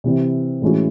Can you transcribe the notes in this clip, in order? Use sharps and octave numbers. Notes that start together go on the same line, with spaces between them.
C3 E3 C4
A2 E3 G#3 C#4 F#4